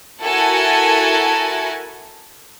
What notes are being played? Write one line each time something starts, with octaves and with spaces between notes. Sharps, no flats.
E4 F#4 A4 A#4 G#5 A5